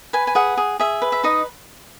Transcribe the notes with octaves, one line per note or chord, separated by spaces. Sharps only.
B4 G#5
G#5
G#4 F#5
G#4
G#4 E5
B4
E5
D#4 D#5